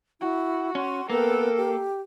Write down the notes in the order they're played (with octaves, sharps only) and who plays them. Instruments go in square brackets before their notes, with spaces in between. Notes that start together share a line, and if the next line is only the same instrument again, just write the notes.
[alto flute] E4 [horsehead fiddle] F#4
[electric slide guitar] C#4 [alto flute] C6
[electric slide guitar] A#3 [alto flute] B3 [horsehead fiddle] A4 G5 [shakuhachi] A#4
[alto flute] G4